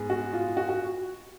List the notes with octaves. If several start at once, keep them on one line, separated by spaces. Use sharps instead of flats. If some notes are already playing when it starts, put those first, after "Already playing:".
Already playing: G#2 B3 G#4
F#4
F4
F#4
F#4